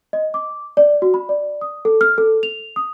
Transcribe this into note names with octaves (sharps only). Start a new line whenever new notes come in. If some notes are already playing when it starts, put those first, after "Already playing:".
D#5
D6
D5
F#4
B5
D5
D#6
A4
F6
A4
F7
D#6